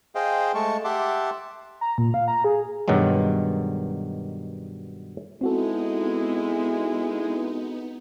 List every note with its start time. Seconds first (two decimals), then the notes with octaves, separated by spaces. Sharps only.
0.15 G#4 C5 D#5 F5 G5
0.55 G#3 A3 A5 C#6
0.84 G4 E5 F#5 A5 C6 D6
1.81 A#5
1.98 A#2
2.14 F5
2.28 A#5
2.44 G#4
2.88 G2 B2 D#3 F#3 G#3
5.41 G#3 B3 C4 D#4 E4 F#4 A4